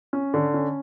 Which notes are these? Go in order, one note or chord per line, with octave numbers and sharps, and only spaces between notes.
C#4
D3
C#4